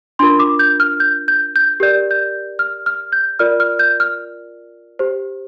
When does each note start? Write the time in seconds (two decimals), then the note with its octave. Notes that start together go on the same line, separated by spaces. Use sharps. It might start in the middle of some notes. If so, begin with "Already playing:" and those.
0.19 D4 F4 A#4 C6
0.39 D6
0.59 G6
0.80 F6
1.00 G6
1.28 G6
1.56 G6
1.80 G4 A#4 D5 G6
2.11 G6
2.59 F6
2.86 F6
3.12 G6
3.39 F4 A#4 D5 F6
3.60 F6
3.79 G6
4.00 F6
4.99 G4 C5